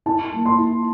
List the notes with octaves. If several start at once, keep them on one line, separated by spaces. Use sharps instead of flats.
E4 A5
A#3
C6
E4